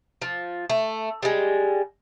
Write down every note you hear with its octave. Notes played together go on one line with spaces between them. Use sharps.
F3
A3
G3 G#3